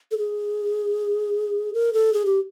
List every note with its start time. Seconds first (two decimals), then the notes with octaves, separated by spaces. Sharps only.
0.11 A4
0.18 G#4
1.74 A#4
1.93 A4
2.13 G#4
2.26 G4